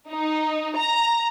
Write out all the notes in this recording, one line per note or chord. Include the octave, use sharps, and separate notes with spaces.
D#4
A#5